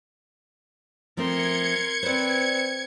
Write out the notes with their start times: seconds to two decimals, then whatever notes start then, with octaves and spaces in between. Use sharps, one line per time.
1.17 F3 A3 C4 A#4 C6 G#6 C#7
2.03 C4 B4 C5 D5